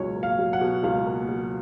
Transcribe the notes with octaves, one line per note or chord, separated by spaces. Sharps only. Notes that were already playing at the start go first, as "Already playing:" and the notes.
Already playing: C#2 B2 F#3 C#5
A#3
F5
F#3
F#5
B2
C#2 F5
A#3
F#3